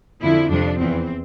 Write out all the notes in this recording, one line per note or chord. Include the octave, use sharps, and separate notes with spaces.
F2 D3 F3 E4
F2 C3 F3 D4
E2 E3 C4